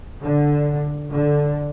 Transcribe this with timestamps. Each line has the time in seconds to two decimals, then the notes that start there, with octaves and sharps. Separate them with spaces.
0.22 D3
1.12 D3